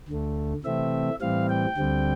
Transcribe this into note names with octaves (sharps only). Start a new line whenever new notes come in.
D2 D3 A3
C3 E3 A3 C4 E5
A2 E3 G3 C4 F5
G5
D2 D3 G3 C4